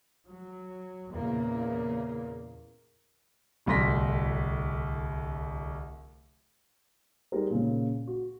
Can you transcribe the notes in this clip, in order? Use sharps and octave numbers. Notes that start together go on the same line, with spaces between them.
F#3
E2 A#2 C#3 A#3
D1 C2 A2 C6 A#6 B6
G3 D#4 G#4 A#4 C5
A#2 C#3
F#4